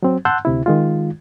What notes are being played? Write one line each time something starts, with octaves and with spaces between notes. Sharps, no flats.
F#3 C4
F#5 A5 C6 E6 F#6 G6
D2 C3 E4
D#3 G#3 F4